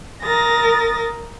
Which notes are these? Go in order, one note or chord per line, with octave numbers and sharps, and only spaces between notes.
A#4 D#6 A6 A#6